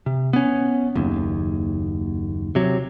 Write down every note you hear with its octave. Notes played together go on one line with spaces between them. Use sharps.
C3
B3 C#4
F#1 D#2
C3 F#3